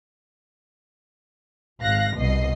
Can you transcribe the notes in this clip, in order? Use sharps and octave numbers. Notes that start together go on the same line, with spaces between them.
G#1 F5 F#6 A#6
C2 B2 D#5 C7